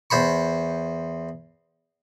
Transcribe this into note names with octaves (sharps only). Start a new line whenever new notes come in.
E2 C5 B5 C#6